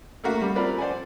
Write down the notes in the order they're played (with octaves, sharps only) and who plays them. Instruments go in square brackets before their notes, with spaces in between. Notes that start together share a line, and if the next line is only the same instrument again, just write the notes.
[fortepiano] A3 A#3 F#4
G3
F3 C4 A#4 B4 D5
C5 D5 F#5 G#5